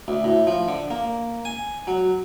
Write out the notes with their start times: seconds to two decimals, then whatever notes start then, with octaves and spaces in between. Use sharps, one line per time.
0.08 D2
0.24 A2
0.47 F3
0.68 D3
0.91 A#3
1.45 G#5
1.87 F#3